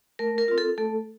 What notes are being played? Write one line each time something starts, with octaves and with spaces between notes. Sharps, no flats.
A3 A#4
A#4
C4 F4
A4
A3 A4